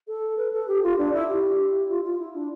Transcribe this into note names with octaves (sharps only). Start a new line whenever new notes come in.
A4
B4
A4
G4
F4
D4
E4
G4
F4
F4
E4
D4